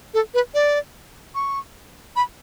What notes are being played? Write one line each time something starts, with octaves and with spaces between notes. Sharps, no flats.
A4
B4
D5
C#6
B5